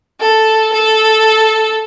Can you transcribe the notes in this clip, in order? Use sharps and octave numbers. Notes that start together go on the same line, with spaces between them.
A4
A4